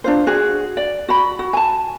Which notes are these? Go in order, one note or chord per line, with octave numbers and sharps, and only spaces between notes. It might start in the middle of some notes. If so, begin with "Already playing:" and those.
D4 F4 C5
F#4 G#4
D5
F#4 B5
F#4
G#5 A5